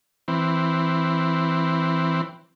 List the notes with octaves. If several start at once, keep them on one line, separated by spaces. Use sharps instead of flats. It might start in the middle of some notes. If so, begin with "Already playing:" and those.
E3 C4